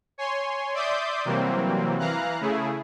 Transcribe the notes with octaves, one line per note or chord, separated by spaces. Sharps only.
C#5 G#5 C6
D5 E5 C6 D6 D#6 G6
C3 E3 F#3 G3 A#3 C4
E3 F5 A#5 F#6
C#3 A3 E4 G#4